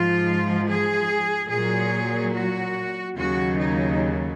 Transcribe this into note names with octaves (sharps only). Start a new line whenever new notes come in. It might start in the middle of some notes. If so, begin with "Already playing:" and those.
Already playing: G#2 F3 F4
G#4
A#2 F#3 G#4
F#4
D#2 C#3 F#3 F#4
D#4